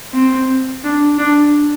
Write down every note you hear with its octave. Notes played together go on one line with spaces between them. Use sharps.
C4
D4
D4